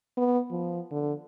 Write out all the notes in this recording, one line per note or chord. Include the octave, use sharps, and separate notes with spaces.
B3
F3
D3